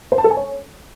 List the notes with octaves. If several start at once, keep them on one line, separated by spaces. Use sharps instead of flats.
C5
A5
A4
G#5
C#5